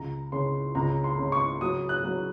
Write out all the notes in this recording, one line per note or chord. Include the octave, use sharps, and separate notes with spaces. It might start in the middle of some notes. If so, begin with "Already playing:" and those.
Already playing: C#2 A#5
C#3 C6
C#2 A#5
C6
C#3
C#6
F#3 D#6
F#6
F#3